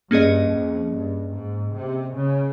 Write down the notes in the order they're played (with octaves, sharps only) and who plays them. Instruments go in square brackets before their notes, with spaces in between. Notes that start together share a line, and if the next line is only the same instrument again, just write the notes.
[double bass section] G2 [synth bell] A#3 C#4 G#4 D#5
[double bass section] F2
G2
G#2
C3
C#3